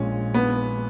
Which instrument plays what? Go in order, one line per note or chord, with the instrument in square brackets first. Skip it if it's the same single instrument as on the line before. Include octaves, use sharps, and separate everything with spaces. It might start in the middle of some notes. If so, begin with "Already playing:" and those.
Already playing: [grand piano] A#1 A#2 G#3 [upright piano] C#4
[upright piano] B3